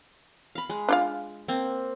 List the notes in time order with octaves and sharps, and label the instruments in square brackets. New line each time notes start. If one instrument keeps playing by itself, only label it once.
[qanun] F5 B5
G#3
[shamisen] D4 F4 F5
[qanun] A#3 C4